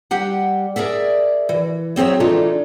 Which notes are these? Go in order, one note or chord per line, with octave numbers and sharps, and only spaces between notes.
G3 G4 F#5
G#4 A#4 D5 E5
E3
F#3 C4 G#4 C#5 E5
E3 G#3 A3 D4 D#4 F4